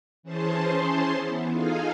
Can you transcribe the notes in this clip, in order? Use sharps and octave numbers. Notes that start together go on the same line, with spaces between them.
E3 C#4 G#4 C5 A5 C6
E3 B3
D#4 F4 G#4 A4 F5 G#5